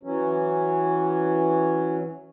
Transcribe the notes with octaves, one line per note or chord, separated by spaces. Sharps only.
E3 F#3 C#4